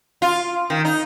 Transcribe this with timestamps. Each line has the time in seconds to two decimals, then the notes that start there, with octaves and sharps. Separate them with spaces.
0.22 F4
0.70 D#3
0.85 D#4